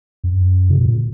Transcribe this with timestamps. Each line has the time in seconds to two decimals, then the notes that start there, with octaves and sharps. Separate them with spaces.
0.24 F#2
0.69 C#3
0.78 B2
0.86 A#2